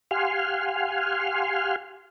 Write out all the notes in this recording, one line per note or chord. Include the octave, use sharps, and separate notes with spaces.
G4 F5 F#5 G#5 C6 F6